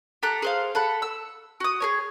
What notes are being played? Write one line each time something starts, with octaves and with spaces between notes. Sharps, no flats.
G4 A4 A#5 F#6
G#4 C5 F5
A4 F#5 B5
E6
F#4 D#6
G#4 A#4 C#5